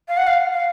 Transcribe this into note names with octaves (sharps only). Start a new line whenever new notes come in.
F5
F#5
F5
F5